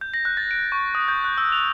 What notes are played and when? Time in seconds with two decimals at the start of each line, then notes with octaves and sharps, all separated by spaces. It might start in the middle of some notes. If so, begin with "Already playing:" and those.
0.01 G6
0.14 A#6
0.25 F#6
0.37 A6
0.51 D7
0.72 C#6
0.95 D#6
1.08 G6
1.24 F#6
1.38 E6
1.52 F7